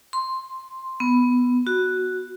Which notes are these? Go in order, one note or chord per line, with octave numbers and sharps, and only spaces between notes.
C6
B3
F#4